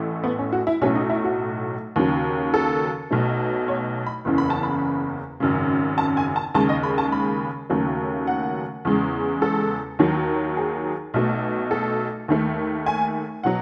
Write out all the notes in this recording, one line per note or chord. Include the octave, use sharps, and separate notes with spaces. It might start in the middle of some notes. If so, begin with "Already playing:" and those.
Already playing: A1 A2 E3 A3
B3
C#4
F#4
E4
B1 A2 F#3 A3 C#4
D#4
E4
F#4
D#2 C#3 F#3
A4
B1 B2 F#3 A3
C#5
B5
F#1 E2 C#3 E3
B5
A5
B5
G#1 F#2 C#3
A5
G#5
A5
D#2 C#3 G#3 A5
D#5
B5
A5
B5
D#2 C#3 F#3 A3
F#5
E2 C#3 G#3
A4
D#2 D#3 F#3
G#4
B1 B2 A3
A4
D#2 D#3 A3
G#5
B2 F#3 F#5